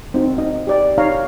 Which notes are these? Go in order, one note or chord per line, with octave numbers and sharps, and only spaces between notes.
C4 D#4 F#4
D#4 D#5
G4 D5
D#4 C#5 F5 A#5